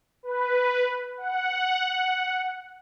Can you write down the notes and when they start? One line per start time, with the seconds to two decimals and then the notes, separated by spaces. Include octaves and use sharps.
0.23 B4
1.17 F#5